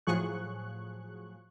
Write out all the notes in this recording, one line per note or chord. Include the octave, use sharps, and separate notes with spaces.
A2 F3 F#3 G#4 C#6 F#6